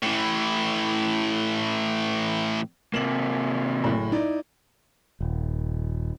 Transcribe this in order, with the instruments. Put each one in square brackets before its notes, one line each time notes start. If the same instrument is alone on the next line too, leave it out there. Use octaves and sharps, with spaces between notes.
[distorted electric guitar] A2 E3
[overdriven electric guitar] C3 A#3 [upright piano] E7 F#7
[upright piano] F#1 A2
D#4 E4 D5
[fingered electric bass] D#1